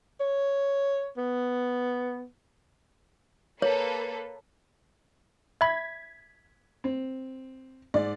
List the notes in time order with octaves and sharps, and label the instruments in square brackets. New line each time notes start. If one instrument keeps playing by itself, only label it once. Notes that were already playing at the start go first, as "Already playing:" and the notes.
[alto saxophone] C#5
B3
[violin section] A#3 A4 B4 [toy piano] C#5
[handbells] E5 B5 [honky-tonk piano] G#6 B6
[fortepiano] C4
[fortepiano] G#2 [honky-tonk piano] D5